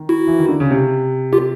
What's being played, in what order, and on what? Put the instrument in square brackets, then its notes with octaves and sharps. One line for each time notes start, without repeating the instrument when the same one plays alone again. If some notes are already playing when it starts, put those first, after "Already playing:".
Already playing: [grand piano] D#3
[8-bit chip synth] E4 F#4
[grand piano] E3
D#3
D3
C#3
C3
[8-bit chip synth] F4 G4